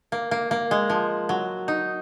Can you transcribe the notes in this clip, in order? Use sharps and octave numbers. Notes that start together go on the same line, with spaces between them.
A#3
A#3
A#3
G#3
F3
F#3
D#4